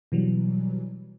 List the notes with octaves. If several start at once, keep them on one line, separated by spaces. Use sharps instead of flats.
B2 E3 F#3 G3